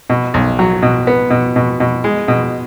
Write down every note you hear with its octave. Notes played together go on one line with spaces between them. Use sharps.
B2
B1
F#3
B2
B3
B2
B2
B2
G#3
B2